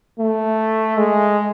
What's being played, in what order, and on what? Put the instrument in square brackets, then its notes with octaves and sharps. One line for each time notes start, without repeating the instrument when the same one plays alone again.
[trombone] A3
G#3